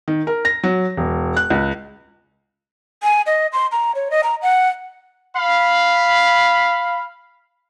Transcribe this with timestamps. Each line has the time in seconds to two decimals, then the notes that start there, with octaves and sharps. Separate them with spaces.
0.08 D#3
0.27 A#4
0.45 A#6
0.63 F#3
0.97 E1
1.37 F#6
1.50 C#2
3.03 G#5
3.26 D#5
3.53 C6
3.72 A#5
3.95 C#5
4.11 D#5
4.23 A#5
4.42 F#5
5.36 F5 B5